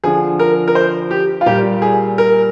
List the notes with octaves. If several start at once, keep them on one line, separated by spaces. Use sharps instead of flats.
D3 F3 G#4
A#4
A#4
C5
G4
F4
A#2 G3 G4
G#4
A#4